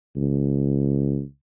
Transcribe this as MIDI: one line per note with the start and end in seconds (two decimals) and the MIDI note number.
0.16 1.22 37